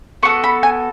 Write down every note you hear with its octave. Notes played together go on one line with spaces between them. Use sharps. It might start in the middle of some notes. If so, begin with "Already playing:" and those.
B3 F#4 A4 C#6
B5
G#5